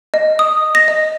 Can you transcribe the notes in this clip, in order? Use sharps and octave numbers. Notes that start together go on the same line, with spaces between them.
D#5
D#6
A#6
D#5